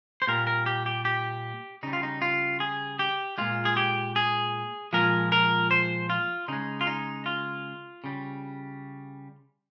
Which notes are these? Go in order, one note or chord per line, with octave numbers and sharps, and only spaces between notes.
C5
A#2 G3 A#4
A#4
G4
G4
G4
C#3 G3 D#4
F4
D#4
F4
G#4
G4
A#2 G#3 F4
G#4
G4
G#4
A#2 F3 G#3 A#4
A#4
C5
F4
C#3 G#3 D#4
F4
D#4
F4
C#3 G3